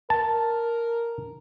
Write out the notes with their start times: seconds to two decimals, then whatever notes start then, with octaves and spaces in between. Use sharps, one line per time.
0.10 A#4 A5